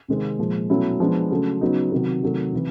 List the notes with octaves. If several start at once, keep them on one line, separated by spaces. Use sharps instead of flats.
C3 D#3 G#3 C4
A#2 F3 G#3
B2 F#3 A3 C#4 E4
F3 G#3 B3 D4
C#3 F#3 A3
C#3 F#3 B3 D#4
C3 D#3 F#3
C3 D#3 F#3 A3
C3 E3